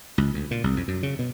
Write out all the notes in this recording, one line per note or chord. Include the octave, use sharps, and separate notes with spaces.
C#2
D2
A#2
C2
F2
F#2
C#3
B2